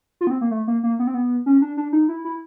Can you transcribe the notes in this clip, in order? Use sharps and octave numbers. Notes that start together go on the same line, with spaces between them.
F4
B3
C4
A#3
A3
A#3
A#3
B3
C4
B3
C#4
D4
D4
D#4
E4
E4